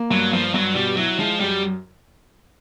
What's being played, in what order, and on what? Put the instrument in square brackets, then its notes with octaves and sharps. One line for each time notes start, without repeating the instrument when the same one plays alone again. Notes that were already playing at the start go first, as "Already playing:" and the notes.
Already playing: [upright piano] A#3
[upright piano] G2 [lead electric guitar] F#3
[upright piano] G2 [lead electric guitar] F3
[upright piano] G2 [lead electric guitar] F#3
[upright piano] B2 [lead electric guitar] G3
[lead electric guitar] F#3 [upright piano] E4
[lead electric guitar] F3 [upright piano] G#3
[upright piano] F#2 [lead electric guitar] G3